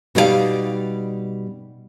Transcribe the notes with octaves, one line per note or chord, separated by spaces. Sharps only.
B2 G3 D#4 E4 D5 F5